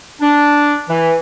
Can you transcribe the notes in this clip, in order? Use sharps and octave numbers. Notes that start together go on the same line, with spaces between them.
D4
E3